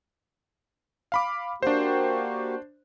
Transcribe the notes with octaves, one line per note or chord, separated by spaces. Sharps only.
F5 B5 D6
A#3 D4 F#4 G4 C5